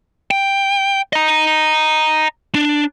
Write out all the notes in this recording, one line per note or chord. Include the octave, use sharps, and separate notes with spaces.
G5
D#5 A#5
D4